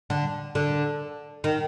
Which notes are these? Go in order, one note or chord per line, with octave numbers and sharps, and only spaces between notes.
D3
D3
D#3